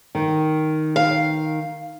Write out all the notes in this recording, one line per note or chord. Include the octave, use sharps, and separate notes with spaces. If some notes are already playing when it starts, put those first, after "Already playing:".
D#3
F5